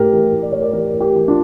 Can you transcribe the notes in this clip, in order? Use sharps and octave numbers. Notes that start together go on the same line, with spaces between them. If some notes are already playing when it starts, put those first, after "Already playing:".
Already playing: A2 G4 A#4
E3
A2
D5
A2 C#5
A#4 D5
E3 G4 A#4
A2
G4 A#4
E3 G4
D4 F4